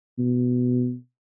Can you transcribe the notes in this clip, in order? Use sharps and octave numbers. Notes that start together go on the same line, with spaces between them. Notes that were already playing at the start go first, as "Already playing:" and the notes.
B2